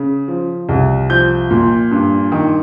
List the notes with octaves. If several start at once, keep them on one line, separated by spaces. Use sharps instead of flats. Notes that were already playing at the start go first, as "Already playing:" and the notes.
Already playing: C#3
F3
C2
F3 G6
A#2
G2
D#3